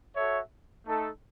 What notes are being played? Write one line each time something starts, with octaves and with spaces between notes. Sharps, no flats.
F#4 A4 C#5 E5
A3 D#4 A4